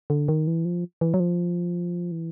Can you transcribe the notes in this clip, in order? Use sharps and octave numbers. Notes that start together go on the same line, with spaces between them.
D3
D#3
E3
F3
E3
F#3
F3
E3